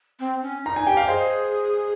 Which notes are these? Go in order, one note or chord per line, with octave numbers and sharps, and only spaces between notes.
C4
C#4
D#4 A#5
G#5
G4 G5
F5
G#4 C5 D#5